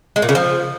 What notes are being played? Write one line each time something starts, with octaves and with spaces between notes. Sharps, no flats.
G#3
A#2
C#3
F3